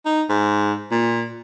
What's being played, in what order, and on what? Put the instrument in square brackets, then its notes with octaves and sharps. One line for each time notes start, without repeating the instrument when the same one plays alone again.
[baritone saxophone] D#4
G#2
A#2